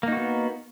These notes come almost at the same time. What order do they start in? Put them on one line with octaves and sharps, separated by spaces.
A#3 D#4 F#4 B3